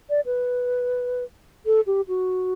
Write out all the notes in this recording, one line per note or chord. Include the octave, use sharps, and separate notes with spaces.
D5
B4
A4
G4
F#4